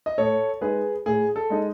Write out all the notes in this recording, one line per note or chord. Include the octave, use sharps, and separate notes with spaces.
D#5
A2 A4 C#5
G#3 D#4 G#4 B4
A2 G#4
A4
G#3 D#4